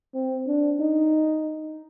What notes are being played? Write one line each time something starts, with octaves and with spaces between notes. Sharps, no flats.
C4
D4
D#4